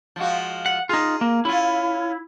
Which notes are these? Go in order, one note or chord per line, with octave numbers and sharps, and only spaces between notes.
F3 G#3 F#4
F#5
D#4 F4 G#4
A#3
C#4 E4 F4